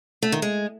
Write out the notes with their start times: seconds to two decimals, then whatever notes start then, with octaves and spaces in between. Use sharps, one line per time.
0.22 A3
0.32 D#3
0.42 G#3